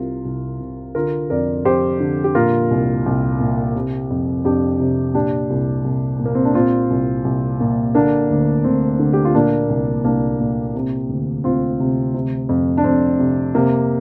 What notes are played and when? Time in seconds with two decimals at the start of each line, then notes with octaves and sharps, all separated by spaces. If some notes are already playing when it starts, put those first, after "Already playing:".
Already playing: C2 C3 F4 A#4
0.25 C2
0.60 C3
0.95 D3 F4 A#4
1.30 F2 A#4 D5
1.65 F2 G4 C5
2.00 D3
2.24 G4
2.35 A#2 F4 A#4
2.71 C2
3.06 C2
3.40 A#2
3.76 C3
4.10 F2
4.45 F2 D4 G4
4.80 C3
5.14 A#2 D4 G4
5.50 C2
5.84 C2
6.19 A#2
6.25 A#3
6.35 C4
6.45 D4
6.54 A#2 C4 F4
6.90 C2
7.25 C2
7.60 A#2
7.95 D3 A#3 D4
8.30 D2
8.64 D2 C4
8.99 D3
9.13 G4
9.25 F4
9.34 A#2 A#3 D4
9.69 C2
10.04 C2 A#3 D4
10.40 A#2
10.75 C3
11.09 D2
11.44 D2 C4 F4
11.80 C3
12.14 C3
12.49 F2
12.77 D4
12.84 F2 C4
13.19 C3
13.55 C3 A#3